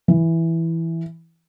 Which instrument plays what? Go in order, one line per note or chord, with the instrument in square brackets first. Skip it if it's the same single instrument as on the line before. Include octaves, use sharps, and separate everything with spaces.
[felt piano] E3